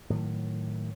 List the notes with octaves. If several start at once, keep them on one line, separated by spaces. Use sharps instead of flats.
A2 D#3 F#3